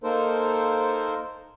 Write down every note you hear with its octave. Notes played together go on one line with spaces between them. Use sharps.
A#3 D#4 A4 A#4 C5